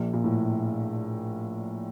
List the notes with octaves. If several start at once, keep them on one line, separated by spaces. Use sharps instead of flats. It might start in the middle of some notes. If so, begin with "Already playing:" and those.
Already playing: A#1 A#2
A#2
A2